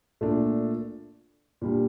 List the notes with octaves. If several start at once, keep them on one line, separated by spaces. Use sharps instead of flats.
A#2 A3 D4
A#2 G3 D4